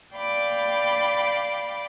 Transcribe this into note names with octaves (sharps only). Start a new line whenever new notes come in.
D5 F5 G5 B5 D6